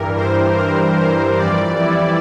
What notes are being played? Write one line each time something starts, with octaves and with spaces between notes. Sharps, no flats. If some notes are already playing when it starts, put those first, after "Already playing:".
Already playing: G2 E3 G3 A#4
C5
A#4
C5
F2 E3 G3 D5
E4